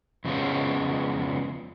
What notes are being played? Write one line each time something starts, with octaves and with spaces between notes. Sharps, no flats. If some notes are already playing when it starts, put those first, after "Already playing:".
F2 C#3 F3 G#3 B3